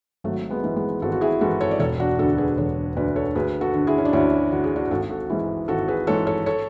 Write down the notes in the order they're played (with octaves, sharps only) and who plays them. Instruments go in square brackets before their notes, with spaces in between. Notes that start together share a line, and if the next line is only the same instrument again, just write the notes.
[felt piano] G#1 F#3 A3
G#3 B3
G#2 E3
G#3 B3
G#1 F#4 A4
F#4
E4 G#4
G#2 E3 F#4 A4
A4 C#5
D5
E1 A4 C#5
D4 F#4
D2 D3 F#4 A4
G#4 B4
E1 A4 C#5
D2 D3 B4 D5
A4 C#5
D2 G#4 B4
F#4 A4
D3
E4 G#4
C#4
D4
D2 C#4 E4
D3 F#4
G#4
D4 F#4
G#1 F#4 A4
F#4 A4
G#2 E3 E4 G#4
G#1 F#4 A4
G#4 B4
G#2 E3 A4 C#5
A4 C#5
A4 C#5